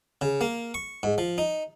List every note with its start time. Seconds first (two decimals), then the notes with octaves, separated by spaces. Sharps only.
0.21 C#3
0.41 A#3
0.74 C#6
1.03 G#2
1.18 F3
1.38 D#4